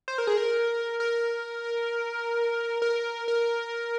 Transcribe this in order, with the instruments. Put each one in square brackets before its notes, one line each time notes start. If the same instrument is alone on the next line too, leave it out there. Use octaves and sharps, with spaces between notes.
[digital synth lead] C5
A#4
G#4
A#4
A#4
A#4
A#4